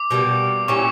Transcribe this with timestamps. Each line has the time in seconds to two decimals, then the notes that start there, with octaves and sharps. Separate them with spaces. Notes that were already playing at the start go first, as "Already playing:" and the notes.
Already playing: D6
0.11 B2 G3 A#3
0.68 A#2 G3 C#4 E4 C#6